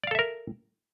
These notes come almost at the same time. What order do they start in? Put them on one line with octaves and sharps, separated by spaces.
D5 F5 A4 E5 A#4